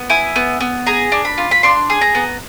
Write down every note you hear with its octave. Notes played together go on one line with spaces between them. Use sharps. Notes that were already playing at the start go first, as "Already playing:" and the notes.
Already playing: B3
E4 G#5
B3
B3
G#4 A#5
D4
B5
F4
B5
D4 C6
G#4
A#5
B3